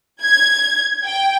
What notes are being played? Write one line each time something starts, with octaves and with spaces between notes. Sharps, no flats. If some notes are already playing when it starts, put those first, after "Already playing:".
G#6
G5